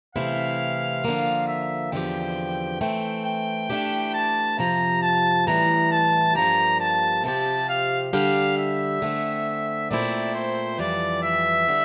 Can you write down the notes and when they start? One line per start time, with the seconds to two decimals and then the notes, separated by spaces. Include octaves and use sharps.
0.15 C3 E3 A3 C4 E4 F5
1.04 D3 F3 A#3 F4
1.48 E5
1.92 E2 D3 F3 C4 G4 G5
2.81 E3 A3 C4 G5
3.26 G5
3.70 E3 A3 D4 G4
4.14 A5
4.58 F2 C3 F3 A#5
5.02 A5
5.47 A2 E3 G3 A#5
5.91 A5
6.35 G2 F3 A#3 D4 G4 A#5
6.80 A5
7.24 C3 F3 C4 G4 A5
7.69 F5
8.13 D3 G3 D4 G4 F5
8.58 E5
9.02 D3 A3 C4
9.90 A#2 A3 C4 E4 D5
10.34 C5
10.79 F2 E3 G3 D5
11.23 E5
11.68 D3 G3